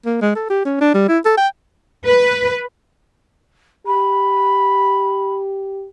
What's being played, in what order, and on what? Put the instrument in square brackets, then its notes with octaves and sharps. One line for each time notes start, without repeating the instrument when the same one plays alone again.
[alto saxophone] A#3
G#3
A4
G4
C#4
D4
G3
E4
A4
G5
[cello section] B4
[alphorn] G4 [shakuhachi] B5